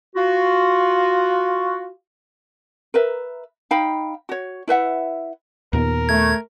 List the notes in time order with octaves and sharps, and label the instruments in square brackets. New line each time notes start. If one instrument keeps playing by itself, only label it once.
[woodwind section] F4 F#4
[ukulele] A#4 B4 E5
D#4 F5 G5 B5
F#4 C#5
E4 B4 E5 F#5
[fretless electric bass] D#2 A#2 B3 [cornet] A#4
[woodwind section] A3 [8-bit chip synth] G#6